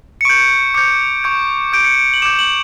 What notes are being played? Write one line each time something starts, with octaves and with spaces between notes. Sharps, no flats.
C#7
C#6 G6 D7
D6 G6 C#7
C#6 G6
D6 G6 D7
C#7
D7
F#7
D6 G6 E7
F#7